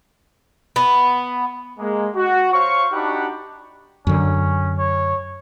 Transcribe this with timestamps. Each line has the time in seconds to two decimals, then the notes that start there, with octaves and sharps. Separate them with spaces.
0.76 B3
1.79 G#3 A#3
2.15 F#4
2.52 C5 C#5 F5 C#6
2.93 D4 D#4 F#4 G4 F#5 B5
4.07 F#2 D3 C#4
4.78 C#5